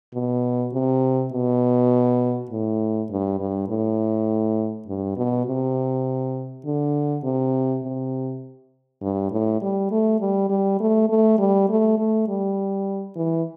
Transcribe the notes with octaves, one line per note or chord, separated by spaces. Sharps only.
B2
C3
B2
A2
G2
G2
A2
G2
B2
C3
D3
C3
C3
G2
A2
G3
A3
G3
G3
A3
A3
G3
A3
A3
G3
E3